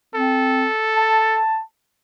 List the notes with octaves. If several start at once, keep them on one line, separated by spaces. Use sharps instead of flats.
C4 A4
A5